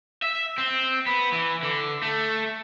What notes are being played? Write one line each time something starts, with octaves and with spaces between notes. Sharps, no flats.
E5
C4
B3
E3
D3
A3